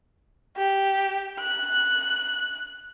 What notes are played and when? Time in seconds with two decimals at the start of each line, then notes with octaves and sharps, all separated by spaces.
0.57 G4
1.40 F#6